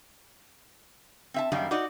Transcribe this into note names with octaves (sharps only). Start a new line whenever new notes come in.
C4 E5 A5
F#2 D#3 G3 A#3 D#4
D#4 F#4 D5 D#5